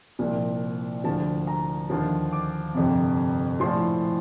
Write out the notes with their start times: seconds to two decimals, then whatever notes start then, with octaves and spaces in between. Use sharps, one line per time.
0.19 C2 A#2 F3
1.04 D2 D3 F3 A5
1.47 A#5
1.90 D#2 D3 F3
2.33 D6
2.74 G1 F2 C3
3.60 A#1 A2 F3 C6